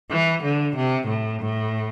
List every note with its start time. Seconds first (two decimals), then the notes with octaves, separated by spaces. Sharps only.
0.11 E3
0.43 D3
0.75 C3
1.08 A2
1.40 A2